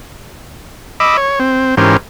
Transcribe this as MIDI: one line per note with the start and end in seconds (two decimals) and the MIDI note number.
1.00 1.17 75
1.00 1.17 83
1.00 1.17 86
1.00 1.17 88
1.17 1.39 73
1.39 1.75 60
1.77 1.97 44
1.77 1.97 52
1.77 1.97 61
1.77 1.97 67
1.77 1.97 70
1.77 1.97 72